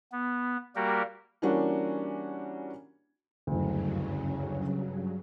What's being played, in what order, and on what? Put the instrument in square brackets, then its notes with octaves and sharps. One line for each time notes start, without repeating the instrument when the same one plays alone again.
[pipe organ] B3
G3 A#3 F#4 G4 A#4
[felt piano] E3 G3 A#3 C#4 D4 F#4
[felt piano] F#1 D2 [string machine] G2 C#3 F#3